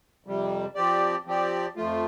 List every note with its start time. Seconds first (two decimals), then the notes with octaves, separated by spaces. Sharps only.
0.25 F2 C3 G3
0.75 F3 C4 G4 D5
1.26 F3 C4 G4 D5
1.76 F2 F3 A3 F4